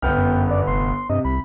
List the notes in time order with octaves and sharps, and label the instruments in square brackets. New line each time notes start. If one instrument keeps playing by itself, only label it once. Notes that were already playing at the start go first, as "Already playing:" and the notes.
[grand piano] G1 B3 F6 [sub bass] C2 [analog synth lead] G5
[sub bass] F#2
[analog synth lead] D5
[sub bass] F1 [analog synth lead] C6
[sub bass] G2 [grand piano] C3 [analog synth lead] D#5
[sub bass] C2 [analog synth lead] B5